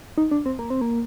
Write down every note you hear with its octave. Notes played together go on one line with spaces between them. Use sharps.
D#4
D4
C4
A#3
C4
A#3